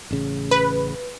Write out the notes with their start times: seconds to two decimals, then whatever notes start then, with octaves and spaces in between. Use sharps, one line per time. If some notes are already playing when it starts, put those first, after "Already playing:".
0.11 A1 C#3
0.51 B4